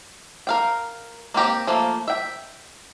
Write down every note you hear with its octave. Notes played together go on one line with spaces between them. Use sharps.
A#4 F5 G5
A#3 C4 G4 A#5
F3 A3 A#3
E5 G5